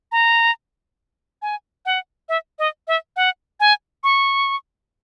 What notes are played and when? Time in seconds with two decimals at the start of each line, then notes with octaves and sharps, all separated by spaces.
0.12 A#5
1.42 G#5
1.86 F#5
2.29 E5
2.59 D#5
2.88 E5
3.16 F#5
3.60 G#5
4.04 C#6